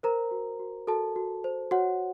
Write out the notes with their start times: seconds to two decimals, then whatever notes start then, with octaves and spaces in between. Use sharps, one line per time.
0.03 A#4 C5 A#5
0.31 F#4
0.59 F#4
0.87 F#4 A4 A5
1.16 F#4
1.44 C5
1.71 F#4 C#5 F#5